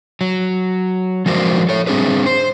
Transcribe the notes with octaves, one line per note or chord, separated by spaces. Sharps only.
F#3
F3 G#3 F#4 A#4 C5 D5
A4 C#5
G3 C4 D4 G#4 B4
C5